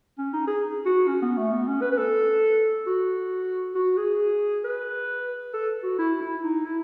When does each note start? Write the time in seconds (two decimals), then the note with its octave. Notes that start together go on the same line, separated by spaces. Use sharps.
0.18 C#4
0.34 D#4
0.48 G#4
0.86 F#4
1.08 C#4
1.22 B3
1.37 A3
1.52 B3
1.68 C#4
1.82 B4
1.92 B4
1.97 A4
2.87 F#4
3.75 F#4
3.97 G#4
4.65 B4
5.54 A4
5.83 F#4
5.99 E4
6.22 E4
6.43 D#4
6.66 E4